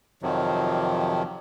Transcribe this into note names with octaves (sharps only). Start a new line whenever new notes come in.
F2 C3 D#3 F3 F#3